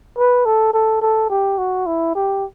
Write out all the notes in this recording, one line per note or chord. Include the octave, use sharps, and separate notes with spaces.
B4
A4
A4
A4
G4
F#4
E4
G4